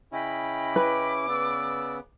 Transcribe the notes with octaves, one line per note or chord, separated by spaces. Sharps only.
C#3 C#4 E4 D#5 G5 B5
B4 D6
C#3 B3 D5 E6